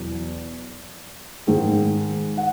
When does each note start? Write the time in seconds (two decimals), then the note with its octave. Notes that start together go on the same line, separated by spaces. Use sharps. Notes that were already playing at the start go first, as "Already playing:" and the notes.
Already playing: E2 B2 F#3
1.47 G#2 D#3 G#3
2.37 F#5